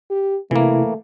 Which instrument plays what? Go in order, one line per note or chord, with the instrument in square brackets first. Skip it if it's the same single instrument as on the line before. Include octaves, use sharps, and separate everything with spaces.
[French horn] G4
[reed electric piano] C3 E4 [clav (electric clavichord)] E3 A#3 [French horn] A3